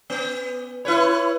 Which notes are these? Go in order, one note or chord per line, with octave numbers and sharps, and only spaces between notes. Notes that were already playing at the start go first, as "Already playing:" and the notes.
B3
E4 B4 C#5